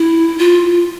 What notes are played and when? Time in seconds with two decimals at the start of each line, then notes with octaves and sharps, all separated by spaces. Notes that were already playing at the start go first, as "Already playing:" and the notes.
Already playing: E4
0.39 F4